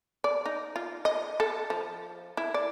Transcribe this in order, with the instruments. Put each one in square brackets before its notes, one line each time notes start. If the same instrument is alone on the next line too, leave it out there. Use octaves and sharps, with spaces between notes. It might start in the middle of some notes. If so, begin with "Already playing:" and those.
[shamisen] D5
D#4
F4
D#5
A4
F3
E4
D5